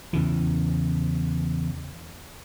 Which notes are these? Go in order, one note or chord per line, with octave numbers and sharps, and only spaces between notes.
E2 C#3 E3